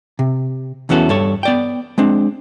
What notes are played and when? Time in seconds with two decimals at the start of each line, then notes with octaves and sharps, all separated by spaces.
0.19 C3
0.89 E2 E3 B3 C#4 F#4 A4
1.09 G2 A4 C#5
1.43 B3 D5 G5
1.98 G#3 C4 D4